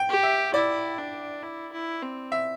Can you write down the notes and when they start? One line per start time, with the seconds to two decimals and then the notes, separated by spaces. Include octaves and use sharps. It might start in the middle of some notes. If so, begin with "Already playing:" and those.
Already playing: G5
0.09 G4
0.23 E5
0.54 E4 D5
0.98 D4
1.43 E4
1.73 E4
2.02 C4
2.32 E5